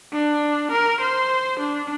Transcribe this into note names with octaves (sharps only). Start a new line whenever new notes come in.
D4
A#4
C5
D4